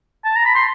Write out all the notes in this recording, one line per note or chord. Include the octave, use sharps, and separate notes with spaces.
A5
A#5
B5
C6